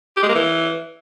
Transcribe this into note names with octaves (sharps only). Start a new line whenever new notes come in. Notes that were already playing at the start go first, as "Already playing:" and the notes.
G4
G#3
A#3
E3